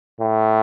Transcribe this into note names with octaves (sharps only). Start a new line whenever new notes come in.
A2